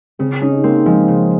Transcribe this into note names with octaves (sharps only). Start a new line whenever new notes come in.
C#3 C4
C#4 D#4
A#3 C4
F3 G#3
C#3